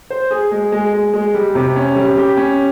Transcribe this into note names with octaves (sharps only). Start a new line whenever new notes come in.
C5
G#4
G#3
G#3
G#3
G#3
G3
C3
C#4
G3
G4
C#4